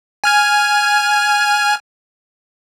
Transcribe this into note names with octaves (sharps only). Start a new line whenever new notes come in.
G#5 F6 G#6